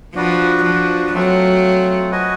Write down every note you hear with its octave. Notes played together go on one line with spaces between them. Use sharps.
F3 D4 F#4 B4
F3
F#3 A3 C4 F4
F#4 B4 D#5 G#5